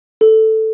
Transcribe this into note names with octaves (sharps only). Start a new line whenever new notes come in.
A4